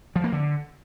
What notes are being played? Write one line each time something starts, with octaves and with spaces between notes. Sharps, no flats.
F3
A#3
D3